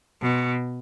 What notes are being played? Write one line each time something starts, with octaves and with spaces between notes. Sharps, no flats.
B2